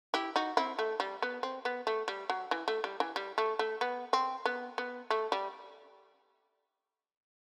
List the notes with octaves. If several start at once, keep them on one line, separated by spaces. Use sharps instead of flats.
E4 G4
D#4 F#4
C4 E4
A3
G3
B3
C4
B3
A3
G3
F#3
E3
A3
G3
E3
G3
A3
A3
B3
C4
B3
B3
A3
G3